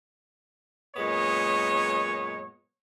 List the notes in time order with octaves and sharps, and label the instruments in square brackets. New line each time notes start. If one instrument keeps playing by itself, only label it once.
[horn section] F#2 A#2 G#3 B3 C#5 D#5